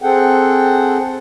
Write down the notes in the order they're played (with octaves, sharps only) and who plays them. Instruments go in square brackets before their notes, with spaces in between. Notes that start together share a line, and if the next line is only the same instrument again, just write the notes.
[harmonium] C4 G#4 A4 F#5 G5